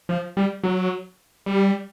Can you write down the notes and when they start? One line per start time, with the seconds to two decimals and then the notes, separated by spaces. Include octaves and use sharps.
0.09 F3
0.37 G3
0.63 F#3
1.46 G3